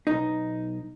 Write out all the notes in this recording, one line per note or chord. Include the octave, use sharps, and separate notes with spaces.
B1 D#4